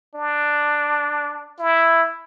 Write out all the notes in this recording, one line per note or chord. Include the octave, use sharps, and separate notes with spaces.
D4
E4